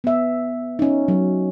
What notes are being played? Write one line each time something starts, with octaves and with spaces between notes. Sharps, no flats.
B3 E5
C#4 D#4
F#3